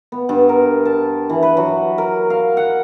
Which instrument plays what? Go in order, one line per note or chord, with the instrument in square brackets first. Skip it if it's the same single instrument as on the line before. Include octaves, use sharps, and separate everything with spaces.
[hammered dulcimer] B3
G2
A#4
A5
E3
B4
F#3
A#4
F5
F#5